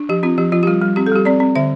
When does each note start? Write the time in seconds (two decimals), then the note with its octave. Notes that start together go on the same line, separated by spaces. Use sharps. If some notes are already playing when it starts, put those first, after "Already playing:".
Already playing: D4
0.09 F3 G4
0.23 C4 F4
0.38 F3 G4
0.52 F3 F4
0.63 G4
0.67 G3 F4
0.82 G3
0.96 C4 G4
1.06 A4
1.12 G3 G4
1.25 C4 D5
1.40 C4
1.55 D3 E5